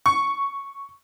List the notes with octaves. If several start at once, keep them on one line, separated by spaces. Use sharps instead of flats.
C#6